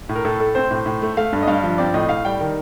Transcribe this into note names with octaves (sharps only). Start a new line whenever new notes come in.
A2
A#4
A2 A4
A3 A4
C4 C5
A2
A2
A3
A3 F5
G2
D#5
G2 F5
F3
C4 D5
A2 D#5
A2 F5
G3 G5
D#3